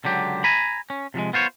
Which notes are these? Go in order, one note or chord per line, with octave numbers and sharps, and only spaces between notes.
C#2 D3 F#3 G4
G#5 A#5 B5
C#4
C3 F3 F#3 G#3
B3 F4 C5 C#5